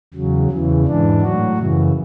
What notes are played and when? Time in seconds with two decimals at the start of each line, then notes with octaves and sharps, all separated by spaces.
0.14 E2 C#3 F#3
0.50 E2 C#3 E3
0.86 G#2 E3 D4
1.21 A2 F#3 F#4
1.57 F#2 C#3 E3